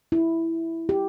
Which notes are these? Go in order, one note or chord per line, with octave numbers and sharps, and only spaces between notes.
E4
G4